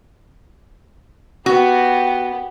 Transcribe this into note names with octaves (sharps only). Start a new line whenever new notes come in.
B3 F#4 G4